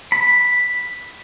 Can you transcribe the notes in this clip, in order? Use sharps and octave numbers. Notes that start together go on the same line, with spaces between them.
B5